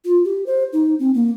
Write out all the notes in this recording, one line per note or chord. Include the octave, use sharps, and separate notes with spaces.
F4
G4
C5
D#4
C4
A#3